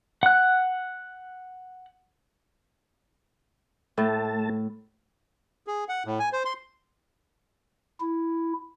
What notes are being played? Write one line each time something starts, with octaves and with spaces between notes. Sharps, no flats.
F#5 F#6
A2 A3 A5
G#4
F#5
A2
G#5
C5
C6
E4